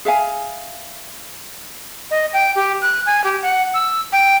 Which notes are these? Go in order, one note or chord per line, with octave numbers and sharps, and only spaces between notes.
G#4 E5 F5 G#5
D#5
G5
G4
F#6
G#5
G4
F#5
E6
G5